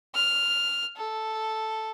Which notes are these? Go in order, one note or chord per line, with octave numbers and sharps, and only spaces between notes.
F6
A4